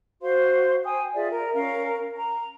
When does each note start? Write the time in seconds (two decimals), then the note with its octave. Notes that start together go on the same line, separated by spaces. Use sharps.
0.21 F#4 C5 F5 C6
0.84 G5 G#5 D#6
1.15 F4 G#4 D5 E5
1.30 A#4
1.53 C#4 A#4 F5
2.17 A#5